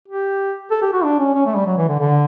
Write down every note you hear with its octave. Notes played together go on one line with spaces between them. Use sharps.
G4
A4
G4
F#4
D4
C#4
C#4
A3
G3
F#3
E3
D3
D3